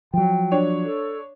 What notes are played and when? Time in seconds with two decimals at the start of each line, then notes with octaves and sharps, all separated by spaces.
0.14 F3 F#3 G5
0.52 D4 C#5
0.85 A4